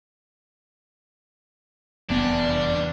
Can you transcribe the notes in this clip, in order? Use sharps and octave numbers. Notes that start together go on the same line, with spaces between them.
F1 E2 G3 B3 D4